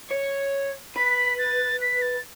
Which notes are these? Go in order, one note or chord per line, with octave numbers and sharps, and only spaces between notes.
C#5
B4 B6
A6
B6
A6